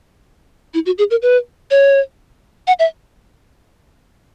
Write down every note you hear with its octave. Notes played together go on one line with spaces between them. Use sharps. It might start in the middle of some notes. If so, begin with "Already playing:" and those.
E4
F#4
G#4
A#4
B4
C#5
F#5
E5